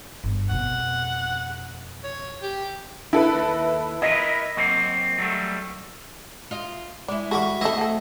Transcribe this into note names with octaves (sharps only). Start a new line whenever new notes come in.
G1
F2 B2 F#5
C#5
G4
E4 A4 B4
D#2
E4 A#4 B4 D#5
F#3 A#3 C4
F#3 G3 A3
F4 D#5
G#3 E4 D5
G3 F#4 A4 B5 C#6
A3 C4 E4 A4 D#5 E5
F#4 A4